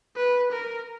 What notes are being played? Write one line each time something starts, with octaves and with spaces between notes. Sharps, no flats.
B4
A#4